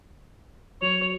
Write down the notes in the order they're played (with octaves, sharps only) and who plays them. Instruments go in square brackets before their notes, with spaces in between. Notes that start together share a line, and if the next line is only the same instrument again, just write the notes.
[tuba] F#3 [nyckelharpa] C#5 [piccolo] F7